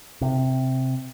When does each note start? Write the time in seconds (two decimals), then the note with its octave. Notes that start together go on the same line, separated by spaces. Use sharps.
0.21 C3